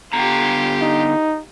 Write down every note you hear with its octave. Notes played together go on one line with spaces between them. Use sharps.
D3 B3 F4 G4 A#5
D#4